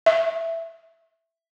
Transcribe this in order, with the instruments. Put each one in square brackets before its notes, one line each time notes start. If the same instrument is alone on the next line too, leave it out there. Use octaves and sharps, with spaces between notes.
[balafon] E5